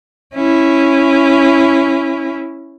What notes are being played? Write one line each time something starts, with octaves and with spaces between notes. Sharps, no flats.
C#4 E4